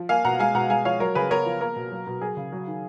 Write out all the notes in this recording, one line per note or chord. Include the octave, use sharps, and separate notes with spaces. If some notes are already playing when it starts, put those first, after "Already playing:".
Already playing: F3
A#3 F5 G#5
B2 F#5 A#5
G#3 F5 G#5
B2 F#5 A#5
G#3 F5 G#5
F3 C#5 F5
F#3 A#4 C#5
C#3 G#4 B4
B3 A#4 C#5
F3
A#3 A#4
B2
F#3
B2
F#3 G#4
C#3
F#3
D#3